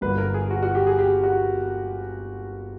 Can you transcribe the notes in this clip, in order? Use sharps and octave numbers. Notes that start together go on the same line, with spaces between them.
G1 G2 D3 F#3 A#3 B4
A#4
G#4
F#4
F#4
G4
G#4
G4
F#4